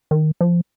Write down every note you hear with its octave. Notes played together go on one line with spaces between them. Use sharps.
D#3
F3